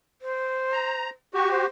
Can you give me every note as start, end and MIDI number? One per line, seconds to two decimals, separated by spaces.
0.22 1.05 72
0.73 1.10 82
1.34 1.66 66
1.34 1.66 67
1.34 1.49 85
1.51 1.65 72